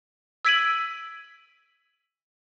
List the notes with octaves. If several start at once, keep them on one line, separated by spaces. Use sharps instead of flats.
E6 G#6 B6 D7 D#7 F#7